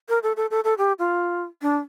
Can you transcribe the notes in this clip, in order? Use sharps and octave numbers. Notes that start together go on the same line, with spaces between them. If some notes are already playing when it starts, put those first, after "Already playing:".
A#4
A4
A4
A4
A4
G4
F4
D4